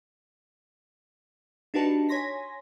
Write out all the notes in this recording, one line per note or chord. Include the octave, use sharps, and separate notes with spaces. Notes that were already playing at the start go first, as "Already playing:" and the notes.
D4 D#4 F#4 G4 B4 A5
C#5 G#5 C6 A#6 B6